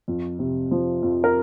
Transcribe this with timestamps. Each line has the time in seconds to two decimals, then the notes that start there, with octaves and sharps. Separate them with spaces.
0.08 F2
0.39 C3
0.71 F3
1.03 F2
1.24 A#4